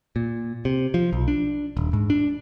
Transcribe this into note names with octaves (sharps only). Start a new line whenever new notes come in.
A#2
C3
F3
B1
D4
D#1
G#2
D4